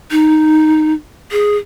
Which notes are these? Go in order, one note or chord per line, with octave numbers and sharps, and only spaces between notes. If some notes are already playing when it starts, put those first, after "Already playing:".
D#4
G#4